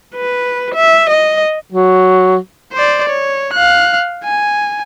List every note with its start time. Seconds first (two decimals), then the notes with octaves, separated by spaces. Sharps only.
0.15 B4
0.75 E5
1.10 D#5
1.72 F#3
2.73 C5 D5
3.09 C#5
3.54 F5 F#6
4.24 G#5